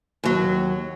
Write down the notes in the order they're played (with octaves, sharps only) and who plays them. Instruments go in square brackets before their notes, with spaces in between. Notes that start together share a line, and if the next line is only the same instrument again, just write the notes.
[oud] D#2 F#3